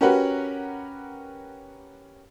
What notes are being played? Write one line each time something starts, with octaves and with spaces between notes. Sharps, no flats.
C#4 F#4 G4 A#4 B4 F#5